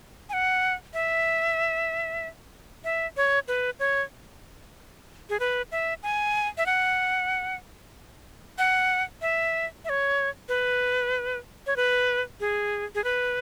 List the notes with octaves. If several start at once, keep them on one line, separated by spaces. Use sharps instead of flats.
G#5
F#5
E5
E5
C#5
B4
C#5
G#4
B4
E5
G#5
E5
F#5
F#5
E5
E5
C#5
B4
C#5
B4
G#4
G#4
B4